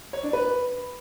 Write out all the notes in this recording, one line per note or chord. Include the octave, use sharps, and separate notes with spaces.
C#5
D4
B4